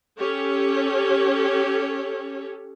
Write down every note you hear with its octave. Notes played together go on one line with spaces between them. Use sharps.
C#4 G4 A4 C#5